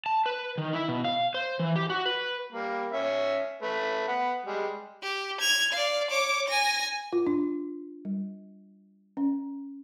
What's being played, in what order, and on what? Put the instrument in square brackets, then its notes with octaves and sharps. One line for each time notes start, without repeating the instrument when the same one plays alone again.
[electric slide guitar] A5
B4
D#3
E4
B2
F5
C5
E3
G4
F#4
B4
[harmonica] G3 A#3
C#4 E5
A3 B4
B4 F#5
G3 G#3
[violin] G4
G#6 F7
D5 F5
C#5 D6
G#5 A#6
[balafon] F4
D4
G3
C#4